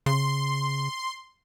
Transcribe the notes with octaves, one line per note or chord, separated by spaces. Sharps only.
C#3 C6